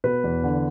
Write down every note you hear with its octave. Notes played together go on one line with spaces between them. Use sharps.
B2 B4
E2
D3